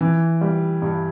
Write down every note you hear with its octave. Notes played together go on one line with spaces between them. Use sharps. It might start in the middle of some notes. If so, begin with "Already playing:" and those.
E3
G3
G2